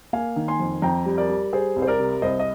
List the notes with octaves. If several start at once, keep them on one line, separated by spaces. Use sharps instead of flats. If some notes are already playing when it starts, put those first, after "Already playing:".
A#3 F5 G#5
D#3
G#5 C6
F2
F2 G5 A#5
G3
A#4 D5
G3
G3 G#4 C5
C2
C5
A#4 D5
C3
C2 C5 D#5
D#5